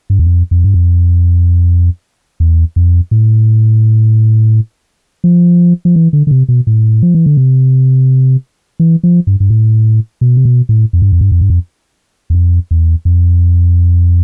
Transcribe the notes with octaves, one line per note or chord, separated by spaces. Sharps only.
G2
E2
F2
F2
G2
F2
E2
F2
A2
F3
F3
E3
D3
D3
C3
B2
A2
F3
E3
D3
C3
E3
F3
G2
G2
A2
B2
C3
B2
A2
F2
G2
F2
G2
F2
G2
F2
E2
F2
E2
F2